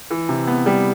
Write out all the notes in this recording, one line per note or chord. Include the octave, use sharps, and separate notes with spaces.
E3
C3
B3
G3